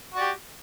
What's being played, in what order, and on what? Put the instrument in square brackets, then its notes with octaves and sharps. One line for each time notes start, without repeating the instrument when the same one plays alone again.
[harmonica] F#4
D5
G4